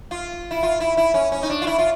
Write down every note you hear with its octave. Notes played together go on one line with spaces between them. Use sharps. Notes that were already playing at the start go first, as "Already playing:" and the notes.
F4
E4
F4
E4
E4
C#4
C#4
D#4
D4
F4
E4
F4